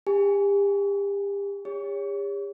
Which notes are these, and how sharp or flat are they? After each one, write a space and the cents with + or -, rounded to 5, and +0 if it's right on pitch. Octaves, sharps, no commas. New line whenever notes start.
G4 +35 G#5 +0
G4 +45 C#5 +15